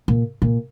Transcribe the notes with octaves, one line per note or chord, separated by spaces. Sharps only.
A#2
A#2